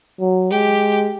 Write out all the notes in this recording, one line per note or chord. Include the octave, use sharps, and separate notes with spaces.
F#3
G#3 G4